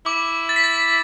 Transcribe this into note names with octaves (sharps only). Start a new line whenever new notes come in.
E4 D6
A6
B6
A6